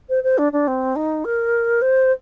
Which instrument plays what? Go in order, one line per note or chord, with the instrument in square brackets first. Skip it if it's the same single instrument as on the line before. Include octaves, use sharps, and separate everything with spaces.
[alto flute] C5
C5
D4
D4
C4
D#4
A#4
C5